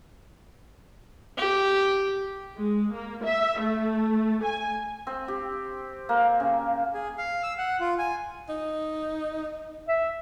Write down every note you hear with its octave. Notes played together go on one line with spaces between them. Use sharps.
G4
G#3
A#3
E5
A3
G#5
C4
G4
A#3
C#3
G#4
F5
E6
F#5
F4
G#5
D#4
E5